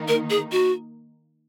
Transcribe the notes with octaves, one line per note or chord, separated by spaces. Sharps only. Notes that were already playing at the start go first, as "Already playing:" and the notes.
Already playing: D#3 A#3 D#4
A#4
G#4
F#4